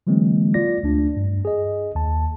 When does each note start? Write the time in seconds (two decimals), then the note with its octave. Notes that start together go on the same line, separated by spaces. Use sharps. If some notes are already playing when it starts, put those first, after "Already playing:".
0.07 D3 E3 F#3 G#3 A#3 C4
0.54 F4 D5 A#6
0.83 D2 A3 D4
1.17 G2
1.45 G#4 D#5
1.95 D#2 A5